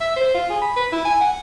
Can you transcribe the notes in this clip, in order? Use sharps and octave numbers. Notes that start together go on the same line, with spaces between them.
E5
C5
F4
G#4
B5
B4
E4
G#5
F#5